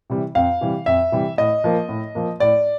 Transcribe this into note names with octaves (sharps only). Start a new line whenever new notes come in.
C3 E3 G3
F2 F5
C3 E3 G3
F2 E5
C3 E3 G3
A2 D#5
F3 A#3
A2
F3 A#3
A2 D5